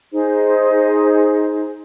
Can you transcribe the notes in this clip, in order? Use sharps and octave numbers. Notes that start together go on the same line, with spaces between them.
D#4 G#4 C5